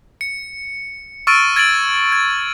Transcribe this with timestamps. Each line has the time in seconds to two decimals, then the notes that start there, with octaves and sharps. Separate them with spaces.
0.21 C#7
1.27 C#6 E6 F6 A6 D7 D#7
1.56 G#6 A6 D7 F#7
2.12 G#6